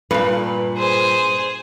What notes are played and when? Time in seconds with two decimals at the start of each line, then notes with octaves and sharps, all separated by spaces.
0.11 G2 A#2 B4
0.77 G#4 C5